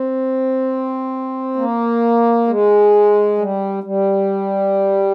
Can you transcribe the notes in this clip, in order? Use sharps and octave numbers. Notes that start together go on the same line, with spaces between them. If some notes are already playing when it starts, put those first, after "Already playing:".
Already playing: C4
A#3
G#3
G3
G3